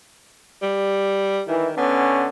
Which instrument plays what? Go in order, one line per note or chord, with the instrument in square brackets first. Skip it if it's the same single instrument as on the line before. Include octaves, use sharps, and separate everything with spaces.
[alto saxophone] G3
[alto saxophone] D#3 [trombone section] E3
[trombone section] D3 C#4 [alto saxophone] B3